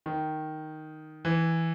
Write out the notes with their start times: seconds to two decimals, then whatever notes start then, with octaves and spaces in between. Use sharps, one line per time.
0.06 D#3
1.25 E3